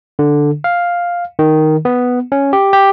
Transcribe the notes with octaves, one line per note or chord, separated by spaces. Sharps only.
D3
F5
D#3
B3
C#4
G4
G4